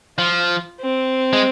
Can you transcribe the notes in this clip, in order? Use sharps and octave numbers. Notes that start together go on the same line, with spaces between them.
F3 F4
C4
G#3